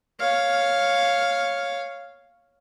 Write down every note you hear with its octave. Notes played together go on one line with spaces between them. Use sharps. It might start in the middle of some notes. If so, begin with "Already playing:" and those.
C#5 F5